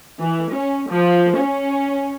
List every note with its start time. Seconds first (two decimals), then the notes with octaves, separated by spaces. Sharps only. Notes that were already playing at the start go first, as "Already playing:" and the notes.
0.23 E3
0.55 C#4
0.91 F3
1.40 C#4